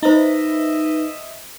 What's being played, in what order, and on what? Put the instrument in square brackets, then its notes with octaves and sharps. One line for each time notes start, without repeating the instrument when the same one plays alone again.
[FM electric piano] D#4 B4 [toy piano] E4 C5 [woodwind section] D#5 E5